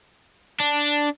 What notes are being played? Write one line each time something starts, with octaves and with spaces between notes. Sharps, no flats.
D4